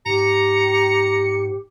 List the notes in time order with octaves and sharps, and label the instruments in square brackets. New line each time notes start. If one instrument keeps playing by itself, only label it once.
[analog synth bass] G#2 [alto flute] G4 [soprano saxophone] A#5 [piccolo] C#7